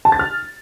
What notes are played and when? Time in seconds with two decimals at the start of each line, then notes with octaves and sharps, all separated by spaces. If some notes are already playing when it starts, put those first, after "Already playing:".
0.05 A5
0.12 A6
0.19 F6